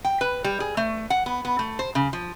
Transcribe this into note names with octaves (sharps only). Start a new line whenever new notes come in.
G5
B4
G3
G#4
A3
F#5
B3
B3
A3
C5
C#3
F3